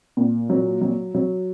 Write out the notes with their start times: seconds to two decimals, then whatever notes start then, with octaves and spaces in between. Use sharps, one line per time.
0.17 A#2
0.50 F#3
0.81 F#3
1.15 F#3